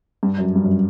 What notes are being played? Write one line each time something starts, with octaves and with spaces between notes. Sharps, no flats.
G2
F#2
G2
F#2